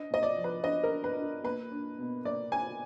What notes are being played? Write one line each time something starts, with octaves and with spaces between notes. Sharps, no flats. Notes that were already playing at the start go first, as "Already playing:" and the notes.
Already playing: D4 D#5
A#2 D#5
D5
F3
B4
D4 D#5
A#4
D4
B4
D4
A#3 B4
D4
B2
A#3 D5
A#3 G#5